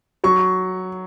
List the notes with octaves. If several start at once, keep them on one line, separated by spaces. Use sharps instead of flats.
F#3 C#6